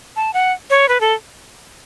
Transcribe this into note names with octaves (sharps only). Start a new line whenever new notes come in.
A5
F#5
C#5
B4
A4